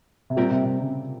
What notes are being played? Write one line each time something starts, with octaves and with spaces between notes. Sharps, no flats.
C3
A#2 G3 C4 G4 A#4
C3
C3
C#3